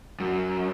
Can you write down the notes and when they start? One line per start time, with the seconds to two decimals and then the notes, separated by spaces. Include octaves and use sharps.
0.20 F#2